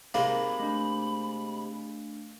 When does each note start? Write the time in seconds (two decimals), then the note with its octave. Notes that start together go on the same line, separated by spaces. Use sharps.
0.14 C3 G#3 A#3 D#4 B5
0.60 A3 D4